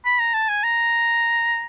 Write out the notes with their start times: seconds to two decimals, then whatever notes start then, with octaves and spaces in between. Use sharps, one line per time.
0.06 B5
0.19 A#5
0.34 A5
0.49 G#5
0.63 A#5